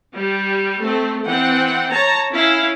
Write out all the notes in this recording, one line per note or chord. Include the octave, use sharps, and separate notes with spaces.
G3
A3 C4
E3 C4 F#5 G5
C#5 A5 A#5
C#4 E4 F5